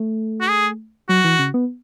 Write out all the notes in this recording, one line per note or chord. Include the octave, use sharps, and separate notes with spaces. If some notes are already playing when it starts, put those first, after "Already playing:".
Already playing: A3
F#4
G#4
F#3 F#4
E3
C#3
B3